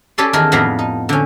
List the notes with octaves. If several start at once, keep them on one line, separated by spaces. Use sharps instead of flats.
C#4 G4 A4 D5 G#5 C6
E2 D#3 D#4 G#4 A#4 G5
F2 A2 B3 D4 F5 A#5
D#4
D3 C#4